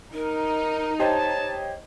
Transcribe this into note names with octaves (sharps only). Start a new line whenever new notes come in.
D#4 A#4
G4 C5 C#5 D#5 A5